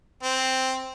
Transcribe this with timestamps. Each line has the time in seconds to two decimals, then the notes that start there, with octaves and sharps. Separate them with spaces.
0.23 C4